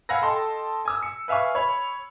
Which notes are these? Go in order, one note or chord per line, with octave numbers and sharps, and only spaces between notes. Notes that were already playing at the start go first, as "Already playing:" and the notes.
F5 F#5 G#5 B5 E6 A#6
A4 D#5 G5 A5 C6
G#5 D#6 E6
C#7
B4 E5 F5 G#5 C#6
C#5 B5